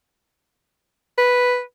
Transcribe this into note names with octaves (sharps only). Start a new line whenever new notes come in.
B4